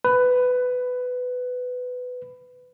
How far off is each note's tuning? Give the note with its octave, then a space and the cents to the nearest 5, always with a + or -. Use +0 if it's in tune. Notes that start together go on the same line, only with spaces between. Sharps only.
B4 +15